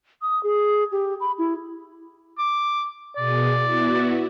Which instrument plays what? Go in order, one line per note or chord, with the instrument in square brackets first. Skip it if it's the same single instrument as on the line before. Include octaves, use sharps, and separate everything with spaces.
[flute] D#6
G#4
G4
B5
E4
[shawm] D6
[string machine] B2 G#4 [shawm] D5
[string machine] B3 E4 F#4